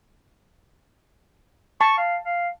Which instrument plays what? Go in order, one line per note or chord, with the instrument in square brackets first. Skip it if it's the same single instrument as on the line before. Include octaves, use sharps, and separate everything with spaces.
[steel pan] A5 [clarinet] C#6
[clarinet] F5
F5